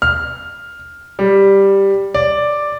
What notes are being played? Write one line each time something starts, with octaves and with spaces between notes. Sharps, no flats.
F6
G3
D5